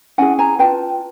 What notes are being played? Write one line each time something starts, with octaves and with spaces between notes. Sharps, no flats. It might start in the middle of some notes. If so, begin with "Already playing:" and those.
C#4 E4 G#4 F#5 G#5
G#5 A#5
F4 G#4 B4 G5 A5